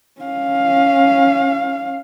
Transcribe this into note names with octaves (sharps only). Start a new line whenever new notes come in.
C#4 F5